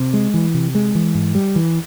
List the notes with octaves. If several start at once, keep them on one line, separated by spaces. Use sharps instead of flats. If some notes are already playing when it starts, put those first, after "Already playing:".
Already playing: C3
G#3
E3
C3
G#3
E3
G#2
G3
E3